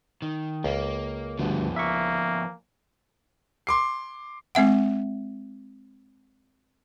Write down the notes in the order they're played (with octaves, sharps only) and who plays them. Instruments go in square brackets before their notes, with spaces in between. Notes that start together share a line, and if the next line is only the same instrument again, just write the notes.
[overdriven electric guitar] D#3
[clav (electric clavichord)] C#2 [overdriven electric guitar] A#3
[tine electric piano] D2 G2 [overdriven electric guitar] F3 B3
[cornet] A#3 [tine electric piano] E5 C#6
[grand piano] C6 D6 C7
[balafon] G#3 C4 E5 F#5